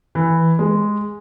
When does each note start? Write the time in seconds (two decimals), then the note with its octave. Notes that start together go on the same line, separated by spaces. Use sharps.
0.15 E3
0.59 G#3